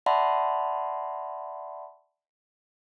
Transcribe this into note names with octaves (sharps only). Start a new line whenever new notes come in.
D5 E5 F#5 A5 B5 C6